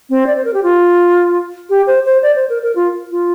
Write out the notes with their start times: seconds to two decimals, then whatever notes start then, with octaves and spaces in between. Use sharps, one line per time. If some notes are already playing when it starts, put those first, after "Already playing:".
0.10 C4
0.27 D5
0.36 C5
0.45 A#4
0.54 G4
0.63 F4
1.70 G4
1.87 C5
2.05 C5
2.23 D5
2.36 C5
2.49 A#4
2.63 A#4
2.76 F4
3.11 F4